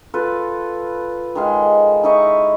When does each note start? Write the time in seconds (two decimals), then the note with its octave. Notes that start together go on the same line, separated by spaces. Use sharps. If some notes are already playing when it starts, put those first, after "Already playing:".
0.14 F4 A4 B4
1.35 D#3 G#3 F5
2.03 D#4 E4 D#5 C#6